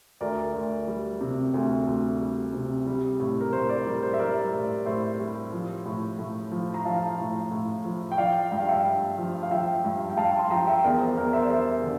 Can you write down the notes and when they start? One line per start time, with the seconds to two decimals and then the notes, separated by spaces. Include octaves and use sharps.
0.21 D2 A#4 D5
0.54 D2
0.87 G3
1.21 C3
1.54 D2
1.87 D2
2.20 G3
2.53 C3
2.86 G3
3.20 A2
3.41 A#4
3.53 A2 C5
3.69 A#4 D5
3.87 G3
4.03 C5
4.14 E5
4.19 G3 A#4 D5
4.53 A2
4.86 A2 C5 E5
5.19 G3
5.52 F3
5.86 A2
6.19 A2
6.52 F3
6.74 A#5
6.85 F3 F5 A5
7.18 A2
7.51 A2
7.85 F3
8.12 G5
8.18 F3 D5 F5
8.51 G2 G5
8.60 F5
8.68 E5 G5
8.85 G2
9.18 F3
9.43 F5
9.51 F3 E5 G5
9.85 G2
10.10 G5
10.17 G2 F5 A5
10.39 C6
10.50 F3 G5 A#5
10.67 E5 G5
10.84 E2 A#4 D5
11.00 C5
11.17 E2 A#4
11.33 C5 E5
11.43 D5
11.50 G3 C5 E5
11.83 D3